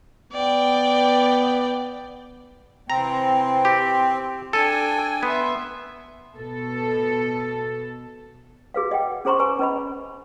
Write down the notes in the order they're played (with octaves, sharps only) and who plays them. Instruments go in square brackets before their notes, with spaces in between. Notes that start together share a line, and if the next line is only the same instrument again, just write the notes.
[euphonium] B3 [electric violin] D5 G5
[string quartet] C3 E3 [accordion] C4 [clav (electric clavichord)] A#5
[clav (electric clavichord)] G4
[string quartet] D4 G5 [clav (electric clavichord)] A4 [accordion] G#5
[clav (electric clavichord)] B3 [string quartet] E5 C6
[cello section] B2 A4
[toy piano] F#4 G#4 B4 F5
D#5 F#5 G5
C#4 G#4 C5 A#5 C6 C#6
B4 G#5 A#5 C#6
C#4 B4 D#5 B5